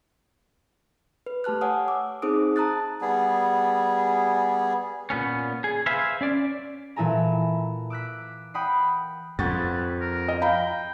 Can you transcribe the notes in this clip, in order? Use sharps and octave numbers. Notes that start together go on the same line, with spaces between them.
B4
A3 G4 A5 F6 F#6
C#5 F#5 G#5 D#6
D6 E6
C4 D#4 G#4 C5 D#6 D7
A5 A#5 D#6 F#6 A6
G3 B3 G#4
A#2 B3 C#4
G#4
B4 C5 E5 F5 G#5
C#4 D5
A#2 E3 E4 A4 G#5 A#5
D6 E6 F#6 B6
F#5 G5 B5 D#6 C7
F2 B4 F#5 C#6 A6
A#4
D#5
F5 G5 A#5 B5